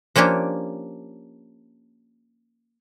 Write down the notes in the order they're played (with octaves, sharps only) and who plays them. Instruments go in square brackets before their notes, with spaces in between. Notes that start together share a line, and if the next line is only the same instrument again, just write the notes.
[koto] F3 A#3 C#4 D4 G4